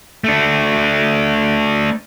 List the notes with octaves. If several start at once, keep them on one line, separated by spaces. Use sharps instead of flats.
A3 D4